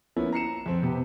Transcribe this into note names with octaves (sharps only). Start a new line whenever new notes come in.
F3 A#3 B3 C#4 E4
A#5 C7 C#7 E7
F2 C4
C3 B3 G4